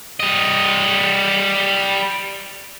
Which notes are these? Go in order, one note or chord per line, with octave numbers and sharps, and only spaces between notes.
G3 D#5